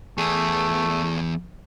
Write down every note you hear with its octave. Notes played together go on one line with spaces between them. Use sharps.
E2 A3 G#4